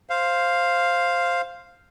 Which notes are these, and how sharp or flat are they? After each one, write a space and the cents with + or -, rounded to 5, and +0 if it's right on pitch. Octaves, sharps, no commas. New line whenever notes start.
C5 +5 F5 +0